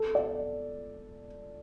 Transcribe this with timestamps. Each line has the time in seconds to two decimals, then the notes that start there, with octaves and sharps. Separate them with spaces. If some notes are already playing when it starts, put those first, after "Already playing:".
Already playing: A4
0.15 D5